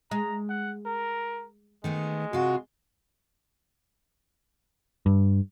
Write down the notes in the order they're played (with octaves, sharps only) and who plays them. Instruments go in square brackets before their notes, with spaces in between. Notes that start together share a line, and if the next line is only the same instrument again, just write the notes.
[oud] G#3 [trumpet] A#5
[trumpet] F#5
A#4
[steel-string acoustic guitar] D#3 A3 B3 [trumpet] G#3
[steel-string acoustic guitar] C3 F4 [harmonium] F#4
[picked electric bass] G2